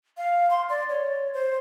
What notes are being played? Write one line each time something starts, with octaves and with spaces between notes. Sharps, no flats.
F5
C6
D5
C#5
C5